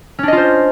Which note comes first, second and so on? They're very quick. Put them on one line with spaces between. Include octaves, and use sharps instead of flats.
C#4 D4 D#5 F4 C5